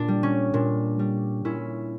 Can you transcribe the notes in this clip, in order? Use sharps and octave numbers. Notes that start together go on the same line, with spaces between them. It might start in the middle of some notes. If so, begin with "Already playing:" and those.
Already playing: A#2 D4
G3
C#4
A#2 D4
G3
A#2 C#4 E4